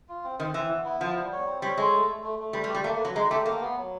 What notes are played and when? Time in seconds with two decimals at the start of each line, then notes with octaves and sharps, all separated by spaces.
0.09 F4
0.24 C4
0.40 D#3 C4
0.54 E3 C4
0.70 B3
0.85 E4
1.00 F3 B3
1.17 G3
1.32 C#5
1.47 C4
1.62 G3 C#5
1.77 G#3 A4
1.92 A3
2.08 A3
2.23 A3
2.39 A3
2.53 G3 B4
2.64 G3
2.69 G4
2.74 G3
2.84 A3 A#3
3.00 F#3 B4
3.15 G#3 D#4
3.30 A3 G4
3.46 A#3 G4
3.61 B3
3.77 F#3